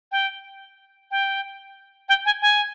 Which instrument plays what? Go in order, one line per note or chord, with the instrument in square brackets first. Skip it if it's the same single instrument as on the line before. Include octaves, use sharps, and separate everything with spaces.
[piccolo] G5
G5
G5
G#5
G#5